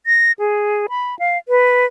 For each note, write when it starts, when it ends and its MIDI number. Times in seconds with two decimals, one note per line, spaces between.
0.06 0.32 94
0.39 0.87 68
0.89 1.18 83
1.19 1.38 77
1.48 1.85 71